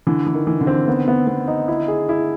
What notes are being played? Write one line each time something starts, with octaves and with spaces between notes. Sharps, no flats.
D3 E3
E3
D#3
E3
D3
C4
B3
B3
B3
D#4
E4
G#4
E4